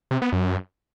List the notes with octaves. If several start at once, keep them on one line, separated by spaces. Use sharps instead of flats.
C3
B3
F#2